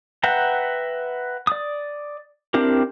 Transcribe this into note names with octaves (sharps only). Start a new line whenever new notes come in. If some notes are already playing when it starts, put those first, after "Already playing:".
B4 E5 F#5 G5 A#5
D5 D#6
C4 D4 E4 G4 A#4